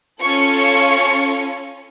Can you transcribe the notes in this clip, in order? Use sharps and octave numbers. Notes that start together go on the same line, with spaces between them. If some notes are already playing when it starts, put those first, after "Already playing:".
C#4 F4 A4 C#6
C#6